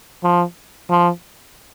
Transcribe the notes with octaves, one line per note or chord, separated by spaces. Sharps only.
F3
F3